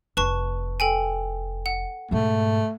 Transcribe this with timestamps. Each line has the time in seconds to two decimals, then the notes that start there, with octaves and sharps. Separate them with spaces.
0.17 F1 B4 A5 C#6
0.80 A4 G5 G#5
1.66 F#5
2.11 G#2 B2 A3